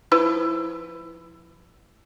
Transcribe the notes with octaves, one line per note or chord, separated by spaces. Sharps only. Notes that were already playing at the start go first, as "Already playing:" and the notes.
F3 E4 B4